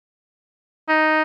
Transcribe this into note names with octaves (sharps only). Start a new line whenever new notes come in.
D#4